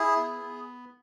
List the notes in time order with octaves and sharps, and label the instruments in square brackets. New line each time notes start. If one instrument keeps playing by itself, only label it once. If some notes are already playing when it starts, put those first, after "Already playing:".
Already playing: [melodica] E4 G#4
B3
B3